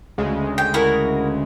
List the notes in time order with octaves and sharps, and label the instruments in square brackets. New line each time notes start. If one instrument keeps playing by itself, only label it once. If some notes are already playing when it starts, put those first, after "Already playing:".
[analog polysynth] D2 C#3 G#3
[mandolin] G5
E4 F#4 A#4